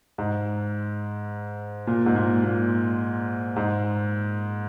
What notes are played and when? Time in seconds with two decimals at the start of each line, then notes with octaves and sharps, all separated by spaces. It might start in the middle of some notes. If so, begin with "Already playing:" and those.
0.18 G#2
1.87 A#2
2.06 G#2
2.15 A#2
2.44 A#2
3.56 G#2